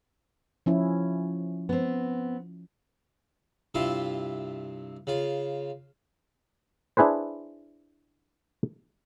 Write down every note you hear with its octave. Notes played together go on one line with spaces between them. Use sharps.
F3 C#4 E4
B3 C4
G2 C3 E4 F4 E5 C6
C#3 F4
D4 E4 G#4 B4 C5